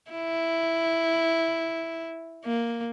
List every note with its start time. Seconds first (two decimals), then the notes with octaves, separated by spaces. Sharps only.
0.11 E4
2.45 A#3